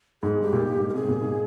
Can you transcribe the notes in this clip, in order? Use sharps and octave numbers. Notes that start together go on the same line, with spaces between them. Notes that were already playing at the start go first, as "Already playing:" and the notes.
G#2 G#4
G2 G4
A#2
G#2
G#2
A#4
C3 G#4
A#2
G#2